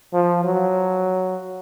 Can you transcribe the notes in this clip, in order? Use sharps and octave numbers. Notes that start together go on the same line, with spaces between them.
F3
F#3